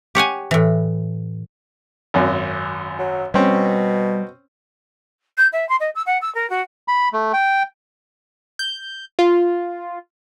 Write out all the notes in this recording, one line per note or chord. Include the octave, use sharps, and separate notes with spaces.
G4 C#5 F#5 G#5
A2 E3
G#1 F#2
F#3
B2 G3 C4 C#4
G6
E5
C6
D#5
E6
F#5
E6
A#4
F#4
B5
A3
G5
G6
F4